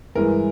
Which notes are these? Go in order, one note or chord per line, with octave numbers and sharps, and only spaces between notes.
G2 E3 G#3 A#4